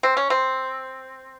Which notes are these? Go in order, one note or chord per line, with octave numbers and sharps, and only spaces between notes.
C4
C#4
C4